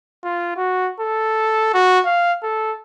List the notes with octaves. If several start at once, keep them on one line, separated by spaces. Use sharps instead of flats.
F4
F#4
A4
F#4
F5
A4